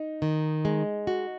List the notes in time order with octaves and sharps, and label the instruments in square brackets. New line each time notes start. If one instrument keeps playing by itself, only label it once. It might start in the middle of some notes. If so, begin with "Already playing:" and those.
Already playing: [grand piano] D#4
[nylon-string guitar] D#3
G#3
F#4